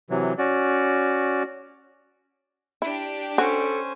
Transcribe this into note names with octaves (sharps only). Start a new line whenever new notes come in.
C3 E3 F#3
C#4 F#4 D5
D4 E4 G4 D7
C#4 F#4 A4 C5 G#5